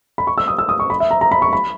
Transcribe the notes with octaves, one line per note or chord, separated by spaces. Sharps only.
B5
C#6
E6
D#6
E6
D#6
C#6
B5
E5
A#5
A#5
B5
C#6
B5